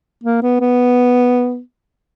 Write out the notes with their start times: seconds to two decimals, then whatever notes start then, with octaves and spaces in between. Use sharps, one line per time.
0.24 A#3
0.42 B3
0.60 B3